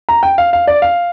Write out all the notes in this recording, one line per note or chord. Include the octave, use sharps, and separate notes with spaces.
A#5
G5
F5
F5
D5
F5